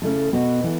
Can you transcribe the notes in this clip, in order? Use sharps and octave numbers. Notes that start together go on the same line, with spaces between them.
C#3 A3 E4 A4
B2 B3 F#4
E3 B3 E4 A4